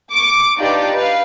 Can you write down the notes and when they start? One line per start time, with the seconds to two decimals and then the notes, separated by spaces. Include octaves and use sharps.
0.12 C#6 D6
0.57 D4 D#4 F4 G4 B4 D5
0.94 B4 F5